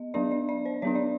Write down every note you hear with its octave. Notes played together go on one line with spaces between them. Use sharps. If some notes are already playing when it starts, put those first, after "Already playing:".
Already playing: B3 D#5
F#3 B3 D4 D5
D5
D5
C5
F#3 B3 D4 C#5
D5